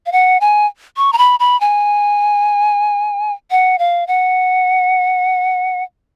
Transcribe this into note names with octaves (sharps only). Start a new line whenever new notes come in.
F5
F#5
G#5
C#6
A#5
B5
B5
G#5
F#5
F5
F#5